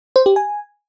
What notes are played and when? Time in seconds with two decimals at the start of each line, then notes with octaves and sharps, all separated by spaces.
0.16 C5
0.26 G4
0.36 G#5